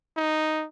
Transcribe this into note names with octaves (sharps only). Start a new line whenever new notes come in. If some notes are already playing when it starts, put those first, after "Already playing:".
D#4